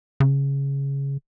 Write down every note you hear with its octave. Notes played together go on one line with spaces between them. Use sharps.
C#3